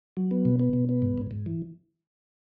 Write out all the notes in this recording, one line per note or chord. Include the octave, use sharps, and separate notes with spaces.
F#3
B3
B2
B3
B2
B3
G#2
G#2
G#2
E3